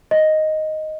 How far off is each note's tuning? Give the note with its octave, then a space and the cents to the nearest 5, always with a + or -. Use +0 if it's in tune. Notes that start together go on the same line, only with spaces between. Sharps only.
D#5 +0